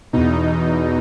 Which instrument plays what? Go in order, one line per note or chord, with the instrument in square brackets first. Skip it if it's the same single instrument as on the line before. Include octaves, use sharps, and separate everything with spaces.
[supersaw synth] E2 B2 D#4